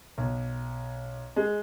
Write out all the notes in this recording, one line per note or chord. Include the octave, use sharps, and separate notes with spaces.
B1
G#3